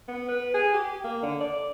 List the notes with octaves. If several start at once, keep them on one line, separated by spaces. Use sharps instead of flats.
B3
B4
G#4
G4
A#3
D3
D5